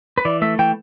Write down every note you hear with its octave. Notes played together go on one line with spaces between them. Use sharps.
B4
E3 D5
A3 E5
E3 G5